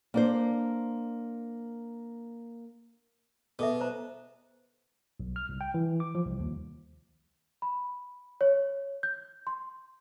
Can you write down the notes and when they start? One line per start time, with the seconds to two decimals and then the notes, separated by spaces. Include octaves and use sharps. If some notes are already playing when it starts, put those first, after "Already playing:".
0.14 A#3 D4 C5
3.59 B2 G#4 A4 E5
3.81 C5 A#5
5.20 B1
5.36 F6
5.49 C2
5.61 G5
5.74 E3
6.00 D6
6.15 F3
6.26 C2
6.40 D#2
7.62 B5
8.41 C#5
9.03 G6
9.47 C6